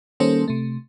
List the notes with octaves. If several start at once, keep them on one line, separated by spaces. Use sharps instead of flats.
D#3 G3 A#3 C#4 A4 C5
C3 A3